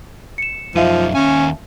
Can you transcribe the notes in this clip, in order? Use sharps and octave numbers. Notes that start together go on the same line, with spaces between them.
C#7 E7
F#2 F3 D#4 E5 F5 D#7
D#2 C#4 G#5